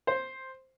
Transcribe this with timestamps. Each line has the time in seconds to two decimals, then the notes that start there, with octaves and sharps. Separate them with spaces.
0.07 C5